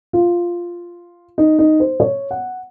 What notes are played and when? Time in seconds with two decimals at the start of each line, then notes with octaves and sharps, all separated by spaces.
0.13 F4
1.38 D#4
1.59 D#4
1.80 C5
2.00 C#5
2.31 F#5